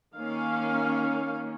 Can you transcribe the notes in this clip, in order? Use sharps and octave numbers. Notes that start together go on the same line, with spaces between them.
D#3 A#3 C#4 F5